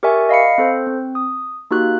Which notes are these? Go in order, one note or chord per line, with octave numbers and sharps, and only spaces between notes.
G4 A#4 D5 E5 G#5 C#6
D#5 F5 B5 C#7
C4 A4 C5
C4
D#6
A#3 D#4 F#4 G4 F#6